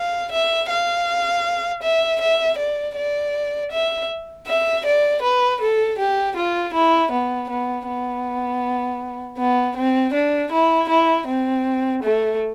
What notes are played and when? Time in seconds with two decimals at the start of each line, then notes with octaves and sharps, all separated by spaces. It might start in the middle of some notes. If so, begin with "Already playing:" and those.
Already playing: F5
0.32 E5
0.70 F5
1.82 E5
2.21 E5
2.58 D5
2.96 D5
3.71 E5
4.47 E5
4.85 D5
5.22 B4
5.61 A4
5.98 G4
6.36 F4
6.73 E4
7.11 B3
7.50 B3
7.87 B3
9.38 B3
9.76 C4
10.13 D4
10.52 E4
10.89 E4
11.27 C4
12.03 A3